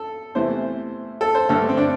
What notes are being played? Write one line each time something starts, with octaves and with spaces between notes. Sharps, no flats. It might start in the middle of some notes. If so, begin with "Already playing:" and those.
Already playing: A4
E2 C3 E3 A3 C5
A4
C5
G2 D3 A3 A4
C4
D4